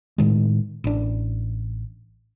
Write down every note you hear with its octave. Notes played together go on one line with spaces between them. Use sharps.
A2 D#3 G#3
A1 D4